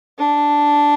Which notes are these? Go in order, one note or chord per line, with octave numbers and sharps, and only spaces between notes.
D4